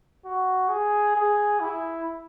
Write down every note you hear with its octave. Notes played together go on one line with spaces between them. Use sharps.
F#4
G#4
G#4
E4